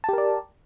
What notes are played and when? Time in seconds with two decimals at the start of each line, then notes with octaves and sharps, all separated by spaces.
0.04 A5
0.09 G4
0.13 A#4
0.18 D5